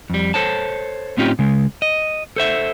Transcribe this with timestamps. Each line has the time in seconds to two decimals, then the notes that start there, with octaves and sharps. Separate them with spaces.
0.10 F2 G3
0.34 A4 C5 C#5 A5
1.18 A2 C4 C#4 D#4 F4 G4
1.39 C#3 G#3
1.82 D#5
2.36 A4 C5 E5